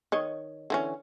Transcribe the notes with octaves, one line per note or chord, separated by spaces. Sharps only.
D#3 C#5 D#5
D3 E3 C#4